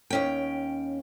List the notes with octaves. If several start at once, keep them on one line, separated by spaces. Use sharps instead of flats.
D#2 C#4 G5